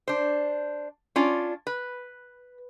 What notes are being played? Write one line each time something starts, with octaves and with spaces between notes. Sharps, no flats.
D4 C5
C#4 D4 F4 D5
B4